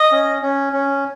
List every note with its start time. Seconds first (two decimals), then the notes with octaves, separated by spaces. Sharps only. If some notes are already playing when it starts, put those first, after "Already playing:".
Already playing: D#5
0.12 C#4
0.42 C#4
0.73 C#4